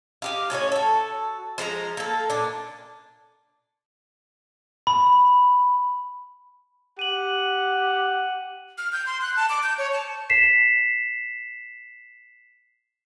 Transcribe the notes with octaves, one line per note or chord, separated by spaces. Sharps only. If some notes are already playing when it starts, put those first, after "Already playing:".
D#4 G4 F5
A2 C#4 F#4 C#5
F#4 A4
F3 G#3 D4 A#5
A#3 A4
A#2 D4
B5
G4 F#5 D#7 F#7
F6
G6
C6
F#6
A5
D6
G6
C#5
A5
B6 C7 E7